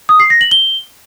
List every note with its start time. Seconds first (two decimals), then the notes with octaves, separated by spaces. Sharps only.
0.09 D#6
0.20 C7
0.30 A#6
0.41 F#7
0.51 G7